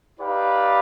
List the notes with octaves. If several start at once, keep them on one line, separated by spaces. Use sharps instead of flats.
D#4 G4 B4 D5 F5